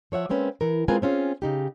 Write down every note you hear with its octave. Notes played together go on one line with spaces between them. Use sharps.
F3 C#5 E5 F#5
G#3 A#3 C4 C#4 B4
E3 A#4
G#3 C4 F4 A#4 B4 G#5
C4 C#4 F4 G#4
C#3 D#4 G4